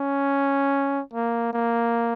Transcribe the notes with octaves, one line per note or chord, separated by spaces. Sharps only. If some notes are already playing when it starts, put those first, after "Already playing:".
Already playing: C#4
A#3
A#3